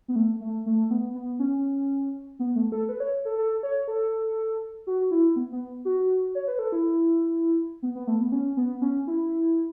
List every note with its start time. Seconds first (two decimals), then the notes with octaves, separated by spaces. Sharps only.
0.08 B3
0.16 A3
0.40 A3
0.66 A3
0.90 B3
1.15 B3
1.39 C#4
2.39 B3
2.56 A3
2.72 A4
2.89 B4
3.00 C#5
3.25 A4
3.38 A4
3.63 C#5
3.88 A4
4.87 F#4
5.11 E4
5.36 B3
5.52 B3
5.85 F#4
6.35 C#5
6.48 B4
6.59 A4
6.72 E4
7.83 B3
7.95 B3
8.07 A3
8.21 B3
8.32 C#4
8.57 B3
8.82 C#4
9.07 E4